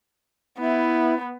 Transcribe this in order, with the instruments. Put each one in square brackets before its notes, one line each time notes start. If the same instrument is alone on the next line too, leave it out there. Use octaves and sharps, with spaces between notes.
[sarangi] B3 [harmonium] E4